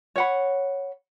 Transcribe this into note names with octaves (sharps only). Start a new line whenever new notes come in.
C#5 F#5 B5